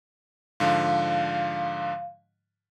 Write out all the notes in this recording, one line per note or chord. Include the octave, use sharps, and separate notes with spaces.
G#2 D3 F3 F5